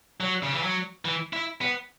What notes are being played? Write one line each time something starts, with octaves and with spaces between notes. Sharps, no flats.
F#3
C#3
E3
F#3
E3
E4
B3